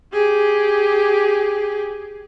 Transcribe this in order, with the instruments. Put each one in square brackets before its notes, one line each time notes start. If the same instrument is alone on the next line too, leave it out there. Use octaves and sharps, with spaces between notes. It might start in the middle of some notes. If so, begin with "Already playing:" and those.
[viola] G4 G#4